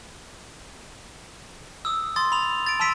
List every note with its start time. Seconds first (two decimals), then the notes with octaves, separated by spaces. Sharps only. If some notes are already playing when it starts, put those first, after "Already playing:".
1.85 D#6 E6
2.16 C6 D#6 A6
2.32 B5 F7
2.66 A6 D7
2.80 A5 C6 E6 B6 D7